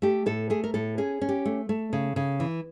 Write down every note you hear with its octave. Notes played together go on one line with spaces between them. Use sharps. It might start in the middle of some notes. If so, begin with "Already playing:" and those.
A3 G4
A2 A4
A3 G#4
A#4
A2 A4
C#4 G#4
C#4
G4
A3
A3
C#3
C#3
E3